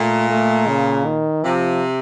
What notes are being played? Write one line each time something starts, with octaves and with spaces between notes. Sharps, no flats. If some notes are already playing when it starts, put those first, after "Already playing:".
Already playing: A#2 A3
A3
C#3
D#3
C3 F3